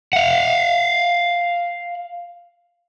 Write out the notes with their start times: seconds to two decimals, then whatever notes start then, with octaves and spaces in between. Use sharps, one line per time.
0.13 F5 F#5